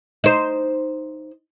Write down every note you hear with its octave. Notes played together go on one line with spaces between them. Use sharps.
D#4 C5